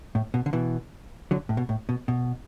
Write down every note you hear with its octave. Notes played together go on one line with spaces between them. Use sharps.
A2
B2
D3
B2 E3
D3 F#3
A2
B2
A2
B2
B2